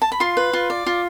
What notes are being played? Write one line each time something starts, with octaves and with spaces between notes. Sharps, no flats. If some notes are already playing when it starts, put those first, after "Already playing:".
A5
B5
F4 C6
B4
F4
D5
F4